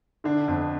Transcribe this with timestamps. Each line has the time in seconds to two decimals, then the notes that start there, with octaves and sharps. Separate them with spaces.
0.24 D3 D4
0.48 F2